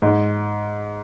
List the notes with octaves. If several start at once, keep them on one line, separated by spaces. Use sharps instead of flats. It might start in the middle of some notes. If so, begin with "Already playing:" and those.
G#2